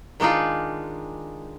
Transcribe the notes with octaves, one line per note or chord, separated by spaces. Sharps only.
D#3 G#3 D4 D#4 F4